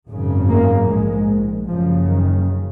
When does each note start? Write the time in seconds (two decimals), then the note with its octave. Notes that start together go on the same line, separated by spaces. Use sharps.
0.08 G#1 F#2 C#3
0.49 A#3
0.88 A#1 G#2 G#3
1.68 F#1 F#2 C#3 F3
2.09 D#3